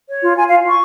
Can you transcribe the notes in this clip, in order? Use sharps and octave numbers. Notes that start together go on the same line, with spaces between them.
C#5
F4
F4 G#5
F5
F4
F4 C#6